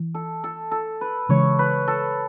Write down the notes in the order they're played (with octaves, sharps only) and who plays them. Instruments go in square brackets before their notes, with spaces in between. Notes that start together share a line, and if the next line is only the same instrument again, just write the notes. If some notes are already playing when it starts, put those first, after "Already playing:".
Already playing: [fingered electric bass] E3
[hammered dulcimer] A4
A4
A4
B4
[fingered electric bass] C#3 E3 G#3 [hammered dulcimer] C#5
[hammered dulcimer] B4
A4